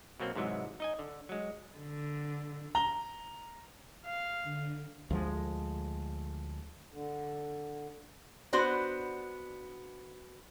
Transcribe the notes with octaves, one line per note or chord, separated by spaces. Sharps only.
B2 F#3 A#3 C4
G#2 C3 E3 F#3 G#3
D#4 D#5 G#5
D3
F#3 G#3
D3
A#5 G7
F5
D3
D2 F3 G#3
D3
B3 D4 F#4 C5